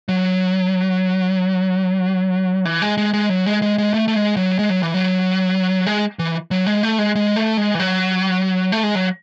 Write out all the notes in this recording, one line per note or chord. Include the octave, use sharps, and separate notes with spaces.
F#3
E3
G#3
G#3
G#3
F#3
G#3
G#3
G#3
A3
A3
G#3
F#3
G#3
F#3
E3
F#3
G#3
E3
F#3
G#3
A3
G#3
G#3
A3
G#3
E3
F#3
A3
G#3
F#3